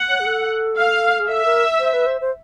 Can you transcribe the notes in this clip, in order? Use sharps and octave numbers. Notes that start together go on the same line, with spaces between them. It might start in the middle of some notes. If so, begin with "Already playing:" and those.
Already playing: F#5
C#5
G#4
A4
F5
G#4
A4 E5
A#4
C5
B4
C5
C5